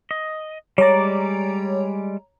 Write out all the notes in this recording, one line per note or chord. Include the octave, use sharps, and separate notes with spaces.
D#5
G3 G#3 C#5 D5 A#5